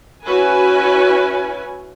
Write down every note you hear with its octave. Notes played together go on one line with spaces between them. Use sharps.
C#4 E4 F#4 B4 G#5